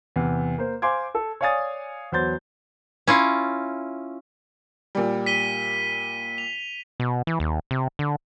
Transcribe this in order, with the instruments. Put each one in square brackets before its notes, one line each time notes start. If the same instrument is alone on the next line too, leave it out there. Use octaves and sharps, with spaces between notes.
[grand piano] E2 C3
A#3 C5
C5 F5 G#5 C6 D6 G#6
A4
C#5 D5 F5 G#5 D#6 A6
E2 F#3 C5 C6 G6 A6
[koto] C#4 E4 F4
[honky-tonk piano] A#2 G3
[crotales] B6 D#7 G7
F7
[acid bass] B2
E3
D#2
C3
D3